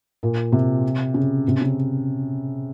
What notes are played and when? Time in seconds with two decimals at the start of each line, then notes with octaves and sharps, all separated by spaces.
0.23 A#2
0.52 C3
1.14 C#3
1.48 C3
1.62 C#3